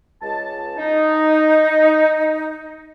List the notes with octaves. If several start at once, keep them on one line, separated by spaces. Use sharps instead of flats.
C#2 A5
D#4